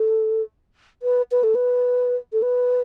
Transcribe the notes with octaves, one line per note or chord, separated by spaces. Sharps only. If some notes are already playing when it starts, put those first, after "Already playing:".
Already playing: A4
B4
B4
A4
B4
A4
B4